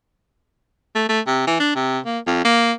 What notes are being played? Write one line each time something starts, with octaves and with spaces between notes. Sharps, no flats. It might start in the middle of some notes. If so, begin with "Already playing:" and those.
A3
A3
C3
E3
D4
C3
A#3
F2
A#3